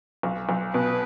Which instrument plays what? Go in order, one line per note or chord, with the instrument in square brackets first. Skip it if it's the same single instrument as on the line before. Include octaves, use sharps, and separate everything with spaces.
[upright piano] B1
B1
[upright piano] B2 [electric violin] B4